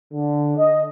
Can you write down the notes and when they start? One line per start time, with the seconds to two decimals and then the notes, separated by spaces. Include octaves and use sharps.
0.13 D3
0.58 D#5